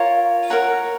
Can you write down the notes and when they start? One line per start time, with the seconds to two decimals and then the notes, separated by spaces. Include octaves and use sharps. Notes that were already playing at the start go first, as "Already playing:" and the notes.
Already playing: F4 A#4 C#5
0.50 A#4 C#5 F#5 A#5